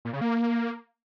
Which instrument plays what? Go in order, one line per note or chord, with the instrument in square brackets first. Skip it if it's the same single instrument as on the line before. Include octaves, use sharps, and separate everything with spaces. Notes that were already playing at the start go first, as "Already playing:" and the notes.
[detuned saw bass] A#2
C#3
A#3